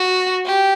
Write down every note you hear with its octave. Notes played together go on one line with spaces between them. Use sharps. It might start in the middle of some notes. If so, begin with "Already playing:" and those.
Already playing: F#4
G4